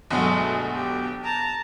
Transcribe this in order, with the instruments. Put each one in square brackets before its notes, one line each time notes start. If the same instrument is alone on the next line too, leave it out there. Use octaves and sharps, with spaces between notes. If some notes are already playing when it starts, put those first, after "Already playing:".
[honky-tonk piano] G1 B2 F#5 [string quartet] F#3 G#3 A3
[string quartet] G4
A5 A#5